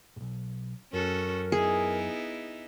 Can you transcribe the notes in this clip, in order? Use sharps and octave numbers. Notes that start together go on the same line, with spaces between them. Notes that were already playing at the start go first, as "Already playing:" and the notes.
B1 G#2
F#2 C#4 F#4 A4 A#4
B3 D#4 E4 G#4